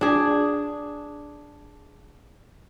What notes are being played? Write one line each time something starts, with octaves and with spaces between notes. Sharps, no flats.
D4 G#4